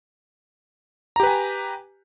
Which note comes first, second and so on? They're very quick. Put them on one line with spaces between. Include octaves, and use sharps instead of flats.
A#5 G4 B4 G#5